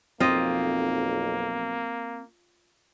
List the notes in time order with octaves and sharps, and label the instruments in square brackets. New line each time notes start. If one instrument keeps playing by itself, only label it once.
[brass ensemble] B1 F2 [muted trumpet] A#3 [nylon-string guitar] C4 [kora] F4 D#5